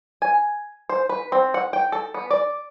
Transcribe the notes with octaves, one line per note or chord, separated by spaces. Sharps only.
G#5
C5
B4
C4
F#5
G5
A4
B3
D5